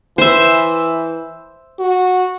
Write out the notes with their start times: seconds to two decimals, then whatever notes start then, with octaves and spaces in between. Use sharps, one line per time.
0.18 E3 C5 E5
1.79 F#4